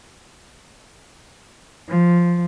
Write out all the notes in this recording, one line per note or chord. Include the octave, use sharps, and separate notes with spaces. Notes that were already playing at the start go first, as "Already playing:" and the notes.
F3